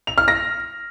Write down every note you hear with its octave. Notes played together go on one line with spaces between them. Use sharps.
F7
F6
A#6